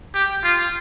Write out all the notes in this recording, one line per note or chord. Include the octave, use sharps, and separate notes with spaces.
G4
F4